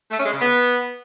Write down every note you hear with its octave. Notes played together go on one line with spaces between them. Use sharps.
A3
C#4
G#3
C#3
B3